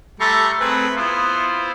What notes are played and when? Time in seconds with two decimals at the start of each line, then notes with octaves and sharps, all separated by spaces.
0.20 G3 A3 A#5 C6 C#6
0.60 A3 C4 G#4 B4
0.96 B3 E4 F4 C5